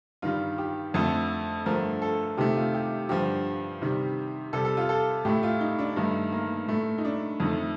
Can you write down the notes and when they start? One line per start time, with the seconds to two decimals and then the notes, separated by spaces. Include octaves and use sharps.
0.22 G2 D#3 G3 F4
0.58 G4
0.94 F2 D3 A3 A4
1.66 G2 D3 F3 A3 A#4
2.02 A4
2.37 C3 D#3 A3 G4
2.56 F4
2.74 G4
3.09 G2 D3 F3 G4
3.82 C3 D#3 G3
4.53 C3 G3 A4
4.65 A4
4.77 F4
4.89 A4
5.25 A2 A3 G4
5.43 F4
5.61 D#4
5.79 D4
5.96 G2 D#3 A3 D#4
6.32 A#3
6.68 A2 A3
6.98 D#4
7.05 D4
7.40 F2 D#3 A3